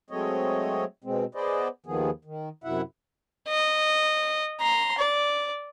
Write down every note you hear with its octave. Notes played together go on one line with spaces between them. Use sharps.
F#3 G#3 A3 C4 C#5 D#5
B2 G#3 C4
B3 G#4 B4 C5 D5 D#5
D#2 D#3 F3 B3 G#4
D#3
F#2 C3 F#3 E4 E5 F#5
D#5
A#5 C6
D5